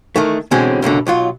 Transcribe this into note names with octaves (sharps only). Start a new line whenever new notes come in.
D#3 E3 A3
B2 D3 E3 G#3 C4 C#4
C#2 F#2 B2 D3
B1 F#3 F4